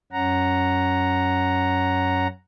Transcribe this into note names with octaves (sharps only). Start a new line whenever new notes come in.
F#2 C#4 F#5 A#5